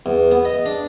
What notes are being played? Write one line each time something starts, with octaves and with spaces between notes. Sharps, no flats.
E2
B3
D#5
D4